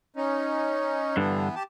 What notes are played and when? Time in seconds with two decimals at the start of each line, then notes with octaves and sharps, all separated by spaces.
0.16 C#4 D#4
1.17 G2 D3 E3 B3
1.56 G4 A5